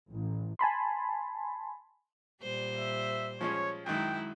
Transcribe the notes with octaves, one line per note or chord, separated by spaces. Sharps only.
A1
G#5 A5 B5 C6
A#2 G3 C5
E5
F3 G#3 C#4 C#5
F#2 D#3 G#3 E4 G5